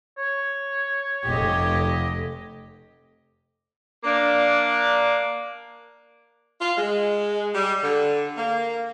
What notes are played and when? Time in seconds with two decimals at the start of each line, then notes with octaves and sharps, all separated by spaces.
0.18 C#5
1.24 F1 G4 D#5
4.04 A#3 D4
6.59 F4
6.77 G#3
7.53 G3
7.82 D3
8.37 A#3